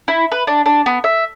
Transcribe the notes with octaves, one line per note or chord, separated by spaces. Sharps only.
E4
B4
D4
D4
B3
E5